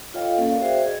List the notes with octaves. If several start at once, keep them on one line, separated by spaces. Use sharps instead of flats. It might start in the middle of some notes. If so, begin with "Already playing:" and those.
F4 A4 C#5 D#5 F5 G5
A#3 C#4 A4
A#4 D5 F5
F#4 G#4 C5 D5 E5 G5
G#4 D#5